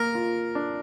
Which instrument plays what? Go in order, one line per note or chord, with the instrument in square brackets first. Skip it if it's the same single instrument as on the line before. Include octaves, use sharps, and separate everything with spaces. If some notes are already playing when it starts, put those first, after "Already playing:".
Already playing: [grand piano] A#3 [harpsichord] A#4
[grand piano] F4
D4